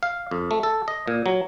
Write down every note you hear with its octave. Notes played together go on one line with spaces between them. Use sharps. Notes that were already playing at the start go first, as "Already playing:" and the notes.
F5
F2
A3
A4
D#5
A#2
F#3